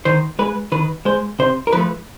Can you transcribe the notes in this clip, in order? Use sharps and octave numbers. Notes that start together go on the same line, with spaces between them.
D#3 C5
G#3 B4
D#3 B4
G#3 C5
C3 C5
A#4
F3 A3 B4